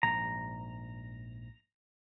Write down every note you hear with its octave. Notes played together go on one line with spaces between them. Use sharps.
A#1 G#2 A#5